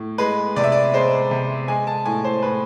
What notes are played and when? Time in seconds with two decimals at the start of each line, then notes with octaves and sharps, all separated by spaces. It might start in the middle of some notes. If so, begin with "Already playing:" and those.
Already playing: A2
0.18 G#3 B4
0.56 C3 D5
0.63 E5
0.72 D5
0.93 G#3 C5
1.31 C3
1.68 G#3 G#5
1.87 A5
2.05 A2 G#5
2.25 C5
2.43 A2 B4